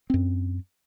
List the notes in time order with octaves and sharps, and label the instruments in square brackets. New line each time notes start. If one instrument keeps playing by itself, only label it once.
[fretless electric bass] F#2 C4